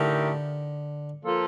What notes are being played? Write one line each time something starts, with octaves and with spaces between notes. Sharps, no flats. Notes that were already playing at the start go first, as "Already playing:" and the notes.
Already playing: A2 D3 A3 D#4 G4 A#4
F3 A#3 F4 A4